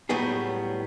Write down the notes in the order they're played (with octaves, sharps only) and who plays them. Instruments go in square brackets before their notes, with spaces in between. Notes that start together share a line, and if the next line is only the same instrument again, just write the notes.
[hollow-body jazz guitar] A2 F#3 G3 B3 G#4